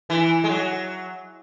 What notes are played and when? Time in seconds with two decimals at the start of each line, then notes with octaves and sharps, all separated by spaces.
0.10 E3
0.44 G#3
0.49 F#3